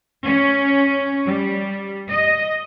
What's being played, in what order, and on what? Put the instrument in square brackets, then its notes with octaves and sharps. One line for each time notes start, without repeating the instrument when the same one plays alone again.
[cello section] C#4
G3
D#5